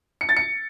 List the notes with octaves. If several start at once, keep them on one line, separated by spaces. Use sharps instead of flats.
C#7
A6
C#7